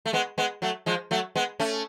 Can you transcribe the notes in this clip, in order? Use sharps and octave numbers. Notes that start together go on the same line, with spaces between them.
A3
G#3 B3
G#3 B3
F#3 A3
F3 G#3
F#3 A3
G#3 B3
A3 C#4